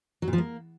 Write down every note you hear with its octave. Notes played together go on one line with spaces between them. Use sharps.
F#3
A#2
F3
A#3